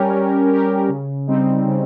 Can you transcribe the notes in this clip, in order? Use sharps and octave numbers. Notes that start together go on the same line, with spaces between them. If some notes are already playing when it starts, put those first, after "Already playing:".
Already playing: G3 C#4 G4 A#4
G3
C#4 G4 A#4
C#3
G3 C4 D#4
C#3